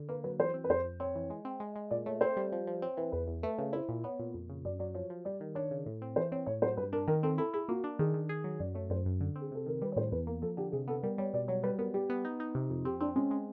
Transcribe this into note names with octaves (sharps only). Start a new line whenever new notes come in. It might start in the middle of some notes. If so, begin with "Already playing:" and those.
Already playing: D3
A#3 B4
F#3 B4
E3 C5
C4
B4
F2 C5
F2
C4 C#5
E3
G#3
C4
G#3
G#3
A#2 D5
A3 C#5
C4 C5
G3
F3
F3
C4 C#5
E3 B4
E2 B4
E2
A3 B4
C#3 B4
E4 C5
A#2
B3 C#5
A#2
F2
C#3
F#2 D5
F#3 D5
F3 C#5
F3
G3 D5
D#3
D4 C#5
C#3
A2
C4
E3 C5
C4 C#5
A2 C#5
F#3 C5
G2 B4
D4 A#4
D#3 A#4
C4 A4
E4 A4
E4 G#4
A#3 F#4
D4
D#3 G#4
D#3
G#4
F#3
F#2 D5
A3 C#5
F#2 C5
F#2
D3
C4
G#4
C3 A4
D#3 A#4
G3 B4
C#5
A2 C5
E2 B4
A#3 A#4
F3 A4
D3 G4
C3 G#4
B3 A4
G3 A#4
G3 C#5
B2 D5
F#3 C#5
G3 B4
B3 A#4
G3 G4
B3
D#4
D#4
C3
F2
C4 G4
C4 D4
G#3 C#4
G#3